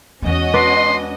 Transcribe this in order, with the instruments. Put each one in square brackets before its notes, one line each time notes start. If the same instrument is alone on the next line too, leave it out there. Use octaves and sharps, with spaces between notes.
[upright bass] E2 G#3 [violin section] C#4 F#4 D#5
[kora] D4 B4 D5 [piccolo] C6